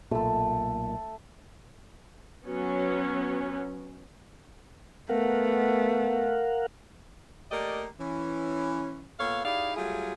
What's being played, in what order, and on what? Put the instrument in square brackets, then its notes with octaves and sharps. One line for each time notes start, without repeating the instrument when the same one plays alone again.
[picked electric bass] B1 A#2 [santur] A3 A4
[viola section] F#3 B3 C#4
[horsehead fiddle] A3 [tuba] B3 [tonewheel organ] A#4 F5 F#5
[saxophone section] A3 A#3 G4 A#4 D5 D#5
E3 C#4
A#2 B3 A4 C#5 F5
D#4 E4 G4 G#4 D5 F5
F#3 G3 A3 F4 G#4